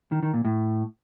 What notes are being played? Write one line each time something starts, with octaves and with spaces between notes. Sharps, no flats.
D#3
D#3
A#2
A2